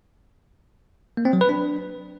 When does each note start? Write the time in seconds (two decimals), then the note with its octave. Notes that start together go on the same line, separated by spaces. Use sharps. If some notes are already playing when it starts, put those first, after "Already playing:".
1.17 A#3
1.25 C4
1.33 F#3
1.41 B4
1.49 D4